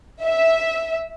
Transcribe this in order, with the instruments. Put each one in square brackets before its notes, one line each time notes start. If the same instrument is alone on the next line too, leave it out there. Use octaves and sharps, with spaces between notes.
[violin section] E5